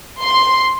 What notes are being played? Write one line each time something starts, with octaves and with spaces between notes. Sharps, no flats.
C6